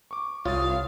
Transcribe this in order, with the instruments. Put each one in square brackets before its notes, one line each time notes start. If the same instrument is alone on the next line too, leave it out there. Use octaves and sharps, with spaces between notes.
[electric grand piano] C#6 D6
[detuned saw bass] C2 [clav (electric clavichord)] F4 [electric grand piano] C#5 D#6 A6 [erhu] F5